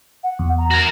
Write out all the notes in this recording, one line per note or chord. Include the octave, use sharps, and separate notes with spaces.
F#5
E2
A#5
F#4 A#4